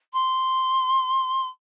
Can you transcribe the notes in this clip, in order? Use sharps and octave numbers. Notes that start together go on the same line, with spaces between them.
C6